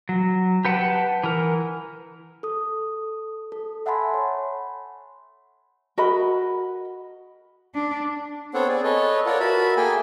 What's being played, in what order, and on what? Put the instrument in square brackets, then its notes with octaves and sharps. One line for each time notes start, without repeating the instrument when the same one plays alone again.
[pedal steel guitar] F#3
G4 B4 F#5 G5 A5
E3 A#4
[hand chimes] A4 D#6
A4
E5 F#5 G#5 A5 B5 C6
C#5
[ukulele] F#4 A#4 D#5 B5
[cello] D4
[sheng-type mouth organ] B3 C4 A4 C5 C#5 F#5
G#4 D5
A4 B4 C#5 D#5
F4 A4 A#4 C#5 D5 F#5
F#4 A#4 E5 A5 B5
A#3 G#4 A4 G5 G#5